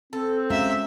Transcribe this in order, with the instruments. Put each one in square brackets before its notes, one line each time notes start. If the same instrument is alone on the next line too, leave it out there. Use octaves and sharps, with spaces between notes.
[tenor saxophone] C4 [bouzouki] A4
[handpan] G#3 C#4 F#4 [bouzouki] A#3 [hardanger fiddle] E5